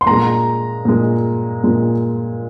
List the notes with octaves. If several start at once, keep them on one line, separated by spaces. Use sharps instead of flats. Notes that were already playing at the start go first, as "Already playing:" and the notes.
C6
A#2 G#3 A#5
A#2 G#3
A#2 G#3